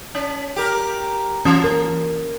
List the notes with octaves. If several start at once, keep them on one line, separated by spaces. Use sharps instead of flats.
C#4
G4 A#4
E3 C#4
A#4